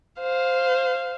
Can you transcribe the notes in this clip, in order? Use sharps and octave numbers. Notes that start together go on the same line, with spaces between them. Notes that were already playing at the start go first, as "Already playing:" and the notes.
C5 F5